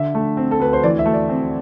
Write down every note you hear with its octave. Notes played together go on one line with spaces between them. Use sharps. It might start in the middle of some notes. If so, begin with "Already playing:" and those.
Already playing: D3 E5
A3
C4
A4
D2 B4
C5
E3 D5
E5
A3
D5
C4